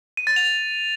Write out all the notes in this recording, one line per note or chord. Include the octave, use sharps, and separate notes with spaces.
D#7
A6
F7